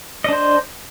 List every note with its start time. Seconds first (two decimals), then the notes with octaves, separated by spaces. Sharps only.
0.24 D#5
0.29 D4
0.33 C5